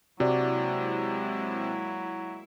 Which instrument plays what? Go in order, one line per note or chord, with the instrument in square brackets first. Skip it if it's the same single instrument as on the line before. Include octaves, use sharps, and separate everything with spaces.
[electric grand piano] C3 [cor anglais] F#3 [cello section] G#3 A#3 E4 [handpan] F#4 D5